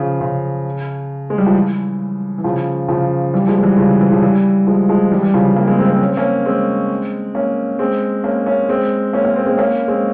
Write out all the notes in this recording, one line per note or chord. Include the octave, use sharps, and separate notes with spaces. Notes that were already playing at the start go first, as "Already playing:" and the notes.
Already playing: C#3 F3
C#3
G#3
G3
F3
E3
E3
C#3 F3
C#3 F3
E3 G3
F3 G#3
G#3
E3 G3
C#3 F3
E3
E3
C#3 F3
E3 G3
F3 G#3
F3 G#3
E3 G3
E3 G3
C#3 F3
E3
G3 A#3
G#3 C4
G#3 C4
G#3 C4
C#4
C4
A#3 C#4
G#3 C4
A#3 C#4
G#3 C4
A#3 C#4
A#3 C#4
G#3 C4
A#3 C#4
A#3 C#4
G#3 C4
G#3 C4
A#3 C#4
G#3 C4